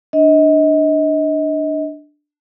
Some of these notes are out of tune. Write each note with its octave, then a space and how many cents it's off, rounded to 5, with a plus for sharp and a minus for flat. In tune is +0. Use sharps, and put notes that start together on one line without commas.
D4 +10 D#5 +30